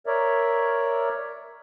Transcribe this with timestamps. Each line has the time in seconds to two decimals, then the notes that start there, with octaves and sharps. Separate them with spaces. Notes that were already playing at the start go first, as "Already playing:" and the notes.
0.07 A#4 C#5 D5 E5